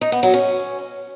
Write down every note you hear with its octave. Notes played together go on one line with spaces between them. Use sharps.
D#4
B3
F#3
C#4